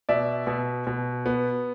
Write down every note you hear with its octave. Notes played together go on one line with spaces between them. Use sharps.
B2 D5 E5
B2
B2
B3